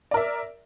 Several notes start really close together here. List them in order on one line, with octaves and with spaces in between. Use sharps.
D5 A#4 E5